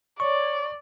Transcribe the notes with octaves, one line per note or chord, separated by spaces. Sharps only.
C#5 D5 C#6